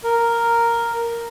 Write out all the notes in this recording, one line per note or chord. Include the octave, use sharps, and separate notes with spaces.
A#4